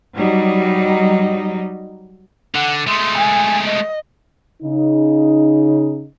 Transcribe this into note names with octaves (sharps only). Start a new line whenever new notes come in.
F#3 G3 D#4
D3 F#5
G#3 A3 C6
G#5
D#5
C#3 D#4